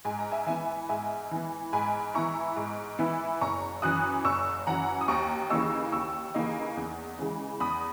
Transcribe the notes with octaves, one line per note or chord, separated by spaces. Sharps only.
G#2 G#5
A#5
E5 G#5
E3 B3 E5 G#5
G#2 E5 G#5
E3 B3
G#2 G#5 B5
E3 B3 E4 A#5 C#6
G#2
E3 B3 E4
F#1 A#5 C#6
F#2 E3 D#6 F#6
F#1 C#6 E6
F#2 E3 F#5 A#5
D#6
D#2 A#5 C#6
C#3 E3 A#3 D#4 C#6 E6
D#2 C#6 E6
C#3 E3 A#3 D#4
E2
C#3 E3 G#3
E2 B5 D#6